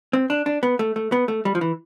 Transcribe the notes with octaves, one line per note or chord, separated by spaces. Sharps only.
C4
D4
D4
B3
A3
A3
B3
A3
G3
F3
E3